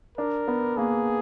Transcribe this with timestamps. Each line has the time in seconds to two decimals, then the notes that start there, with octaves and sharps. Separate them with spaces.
0.18 D4 A#4
0.48 B3
0.77 A#3 G#4